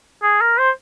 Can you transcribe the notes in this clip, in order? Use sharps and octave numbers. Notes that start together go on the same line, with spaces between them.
G#4
A#4
C5